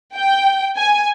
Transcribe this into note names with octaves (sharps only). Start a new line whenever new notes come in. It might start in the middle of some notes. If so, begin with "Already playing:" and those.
G5
G#5